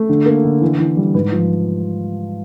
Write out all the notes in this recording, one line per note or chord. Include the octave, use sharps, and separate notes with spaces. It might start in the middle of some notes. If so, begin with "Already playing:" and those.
Already playing: A3
D3
A#3
D3
E3
E3
G3
G#2 B4
F3